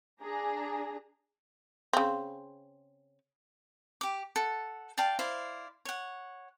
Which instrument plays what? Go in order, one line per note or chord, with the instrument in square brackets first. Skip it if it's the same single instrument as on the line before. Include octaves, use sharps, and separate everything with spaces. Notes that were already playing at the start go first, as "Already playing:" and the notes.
[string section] D4 G#4 A#5
[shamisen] C#3 C4
[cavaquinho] G4 D6
A4 F#5
D5 F5 G5 A5
E4 C5 D5 F5
C#5 F#5